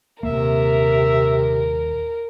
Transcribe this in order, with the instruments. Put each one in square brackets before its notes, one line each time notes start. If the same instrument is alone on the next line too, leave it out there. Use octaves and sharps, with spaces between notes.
[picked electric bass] D#1 A#3 [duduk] C3 [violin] A#4 [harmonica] E5